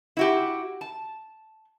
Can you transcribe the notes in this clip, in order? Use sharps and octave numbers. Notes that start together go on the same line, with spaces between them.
E4 F#4 G4
A5